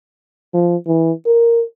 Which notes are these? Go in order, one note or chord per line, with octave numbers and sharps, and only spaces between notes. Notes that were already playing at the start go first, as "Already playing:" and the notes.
F3
E3
A#4